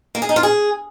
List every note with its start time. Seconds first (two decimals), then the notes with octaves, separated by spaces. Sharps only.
0.15 A#3
0.22 G#4
0.29 D#4
0.36 F4
0.43 G#4